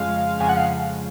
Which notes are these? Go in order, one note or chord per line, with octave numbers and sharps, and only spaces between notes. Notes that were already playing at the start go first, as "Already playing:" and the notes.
Already playing: F2 C#3 F3 G#3 C#4 F5
F2 C#3 F3 G#3 C#4 G#5
F#5
F5